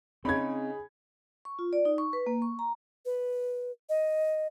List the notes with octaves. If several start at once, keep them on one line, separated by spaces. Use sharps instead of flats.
C#3 C4 D#4 G#4 C#5 B5 G#6
C#6
F4
D5
D#4
C#6
B4
A#3
C#6
A#5
B4
D#5